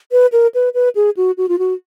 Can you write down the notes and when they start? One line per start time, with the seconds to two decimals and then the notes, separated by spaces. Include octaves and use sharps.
0.12 B4
0.32 A#4
0.54 B4
0.74 B4
0.95 G#4
1.17 F#4
1.38 F#4
1.49 F4
1.59 F#4